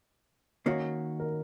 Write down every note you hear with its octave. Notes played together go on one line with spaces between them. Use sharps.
D#3 A#3 C#4 F#4 C#5
A#4